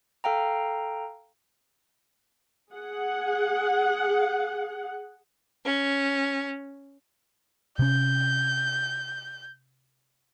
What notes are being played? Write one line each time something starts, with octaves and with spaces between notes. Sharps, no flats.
A4 F5 G5 A#5
G#4 F#5
C#4
C3 C#4 G6